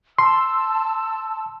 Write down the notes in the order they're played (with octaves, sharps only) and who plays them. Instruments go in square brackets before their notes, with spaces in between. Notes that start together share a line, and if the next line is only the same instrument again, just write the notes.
[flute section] A5 E6 [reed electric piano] C6